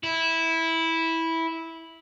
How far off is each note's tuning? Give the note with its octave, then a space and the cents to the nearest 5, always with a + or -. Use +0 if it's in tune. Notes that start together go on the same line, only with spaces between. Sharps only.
E4 -10